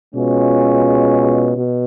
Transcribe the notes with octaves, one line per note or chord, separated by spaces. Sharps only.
B2 G#3 C#4 F4
B2